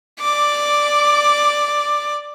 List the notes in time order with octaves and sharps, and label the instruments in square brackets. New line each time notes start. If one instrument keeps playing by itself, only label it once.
[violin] D5 D6